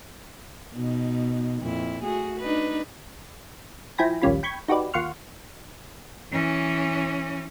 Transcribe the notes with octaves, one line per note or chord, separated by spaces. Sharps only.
B2 D#4
F2 A#2 E4
A3 F#4 G#4
D4 D#4 B4
F3 E4 G5 G#5 B5 A#6
A#1 D#2 G3 C#4 F4 B5
G5 B5 C#6 G6 G#6
D#4 F#4 G4 B4 D5
D#2 F4 F#5 C6 C#6 F6
E3 C#4